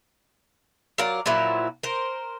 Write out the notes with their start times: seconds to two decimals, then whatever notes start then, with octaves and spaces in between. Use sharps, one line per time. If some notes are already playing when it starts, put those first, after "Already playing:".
0.98 F#3 F4 A#4 D5
1.26 A#2 F3 F#3 E4
1.83 A#4 C5